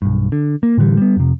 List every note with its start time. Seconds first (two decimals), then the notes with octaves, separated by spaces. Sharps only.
0.02 B1 G2
0.32 D3
0.63 A#3
0.77 A2 D3 E3 G3
0.97 G3 B3
1.16 F2 C3